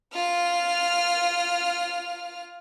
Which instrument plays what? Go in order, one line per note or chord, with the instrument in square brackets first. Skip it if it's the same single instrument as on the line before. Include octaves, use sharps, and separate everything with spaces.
[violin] F4 F6